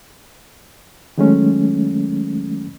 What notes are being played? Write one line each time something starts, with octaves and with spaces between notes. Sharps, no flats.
D#3 F#3 G#3 A3 C#4